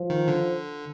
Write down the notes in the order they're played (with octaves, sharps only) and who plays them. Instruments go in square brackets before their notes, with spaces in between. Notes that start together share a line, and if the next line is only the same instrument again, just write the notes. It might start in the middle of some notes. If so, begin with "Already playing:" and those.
Already playing: [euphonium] F3
[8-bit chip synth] D#3
D3